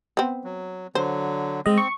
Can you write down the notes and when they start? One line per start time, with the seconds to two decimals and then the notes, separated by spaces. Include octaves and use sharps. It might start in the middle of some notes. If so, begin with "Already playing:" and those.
0.17 B3 C4
0.44 F#3
0.95 D3 F#3 C5
1.66 G#3 C4 D#5
1.78 C#6